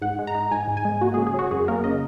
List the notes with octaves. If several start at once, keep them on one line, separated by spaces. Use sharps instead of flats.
G#2 F#5
G#3
A#5
D#4
G#2 G#5
G#2
G#5
G#3
A#3 F#4
C#3 G#4
G#4
F#3 F#4
F#2 G#4
A#3 A#4
C#3 D#5